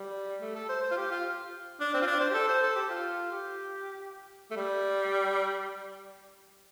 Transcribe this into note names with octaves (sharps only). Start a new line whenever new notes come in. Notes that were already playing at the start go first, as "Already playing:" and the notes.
Already playing: G3
A3
A4
C5
C5
F4
G4
F4
D4
C4
F4
D4
C5
G4
A4
C5
A4
G4
F4
G4
A3
G3